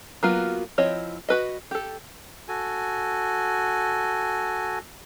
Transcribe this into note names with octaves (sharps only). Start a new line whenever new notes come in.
F#3 A#3 B3 F4 F#4
F3 C4 E4 C#5 D#5
F#4 B4 D#5
G4 A4
F#4 A4 G#5